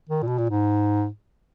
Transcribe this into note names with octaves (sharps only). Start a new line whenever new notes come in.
D#3
A#2
B2
A#2
G#2